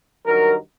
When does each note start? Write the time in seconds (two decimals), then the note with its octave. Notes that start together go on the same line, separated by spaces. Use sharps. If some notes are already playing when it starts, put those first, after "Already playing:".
0.26 G2 D#3 F#3 A#4